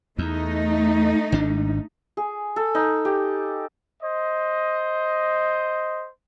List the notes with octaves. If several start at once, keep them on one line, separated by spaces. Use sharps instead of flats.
E2 A3 D#4
G#1 G#2 D4
G#4
A4
D#4
G4
C5 D#5